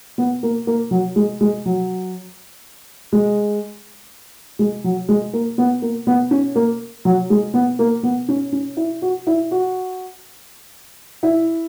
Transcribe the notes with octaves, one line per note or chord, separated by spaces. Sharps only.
B3
A#3
A#3
F#3
G#3
G#3
F#3
G#3
G#3
F#3
G#3
A#3
B3
A#3
B3
C#4
A#3
F#3
G#3
B3
A#3
B3
C#4
C#4
E4
F#4
E4
F#4
E4